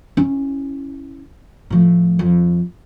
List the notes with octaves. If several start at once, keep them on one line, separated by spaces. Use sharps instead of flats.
C#4 E4
A2 F3
F2